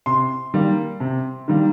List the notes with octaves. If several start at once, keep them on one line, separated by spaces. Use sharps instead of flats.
C3 C6
D#3 G3 A#3
C3
D#3 G3 A#3